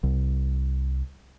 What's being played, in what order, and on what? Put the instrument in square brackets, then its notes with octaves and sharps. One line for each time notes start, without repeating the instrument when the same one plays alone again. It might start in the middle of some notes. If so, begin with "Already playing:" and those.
[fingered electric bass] C2